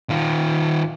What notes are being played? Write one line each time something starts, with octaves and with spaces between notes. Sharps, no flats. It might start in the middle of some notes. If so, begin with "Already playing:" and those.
D#3 F4